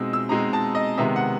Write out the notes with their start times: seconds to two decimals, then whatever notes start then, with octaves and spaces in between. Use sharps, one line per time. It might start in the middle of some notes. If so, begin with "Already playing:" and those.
Already playing: B2 G#3 C4 D#4 E6
0.13 E6
0.29 B2 G#3 C4 D#4 A#5
0.53 A5
0.75 D#5
0.98 C3 D#3 G#3 B3 E5
1.16 F#5